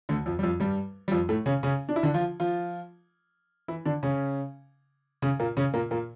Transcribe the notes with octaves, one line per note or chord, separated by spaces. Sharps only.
D2 D3
F2 F3
G3
F2 F3
G2 G3
G3
F2 F3
A2 A3
C#3 C#4
C#3 C#4
D4
E4
D3 D4
F3 F4
F3 F4
E3 E4
D3 D4
C#3 C#4
C#3 C#4
A#2 A#3
C#3 C#4
A#2 A#3
A#2 A#3